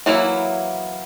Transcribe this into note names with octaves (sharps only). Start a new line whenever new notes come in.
E3 F#3 A#3 E4